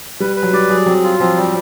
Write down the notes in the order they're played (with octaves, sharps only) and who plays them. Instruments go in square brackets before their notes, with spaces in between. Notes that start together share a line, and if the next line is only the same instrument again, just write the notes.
[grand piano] G3 [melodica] B4
[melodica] B4
[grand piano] F#3
[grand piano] G3 [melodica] D5
[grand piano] F#3 [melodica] G#4
[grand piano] F#3 [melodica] C4
[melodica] F4
[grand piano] F3 [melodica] C4
[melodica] G3